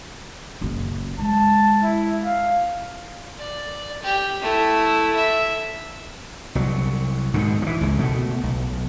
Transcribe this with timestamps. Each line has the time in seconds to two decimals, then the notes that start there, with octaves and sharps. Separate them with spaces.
0.61 F#1 C#3
1.19 G#3 A5
1.83 E4
2.24 F5
3.38 D5
4.02 G4
4.42 A3 E4
5.15 E5
6.55 C2 F#3
7.34 G#2 B2 D3 D#3
7.62 E3 F3
7.81 C#2 C#3
7.99 B2 A3
8.43 B1